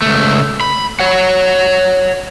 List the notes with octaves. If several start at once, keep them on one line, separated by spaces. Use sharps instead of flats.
C#2 A3
B5
C#5 F#5